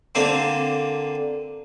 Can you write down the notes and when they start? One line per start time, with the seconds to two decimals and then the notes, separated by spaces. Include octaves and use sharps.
0.15 D3 A#3 C4